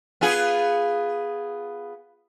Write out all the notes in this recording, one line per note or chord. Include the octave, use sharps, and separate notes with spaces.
B3 F4 G#4